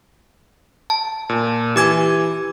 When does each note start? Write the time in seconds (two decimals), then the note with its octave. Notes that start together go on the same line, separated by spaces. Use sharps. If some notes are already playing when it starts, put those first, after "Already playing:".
0.90 A5
1.29 A#2
1.76 E3 G4 G#5 D6 G#6